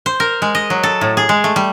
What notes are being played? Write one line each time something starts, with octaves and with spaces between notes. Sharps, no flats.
C5
A#4
G#3
D#5
F#3
A4
A2
G#4
G#3
A3
G3